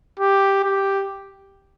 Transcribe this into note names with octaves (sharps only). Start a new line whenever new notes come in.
G4
G4